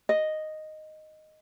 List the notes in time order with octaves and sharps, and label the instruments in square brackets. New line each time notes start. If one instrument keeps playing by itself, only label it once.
[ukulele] D#5